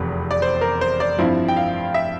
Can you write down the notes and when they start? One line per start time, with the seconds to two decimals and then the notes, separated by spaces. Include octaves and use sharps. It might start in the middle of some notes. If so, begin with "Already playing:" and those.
Already playing: F1 E2 C3
0.31 D5
0.42 C5
0.61 A#4
0.81 C5
1.00 D5
1.18 G2 F3 C4 E4
1.48 G5
1.57 F5
1.94 E5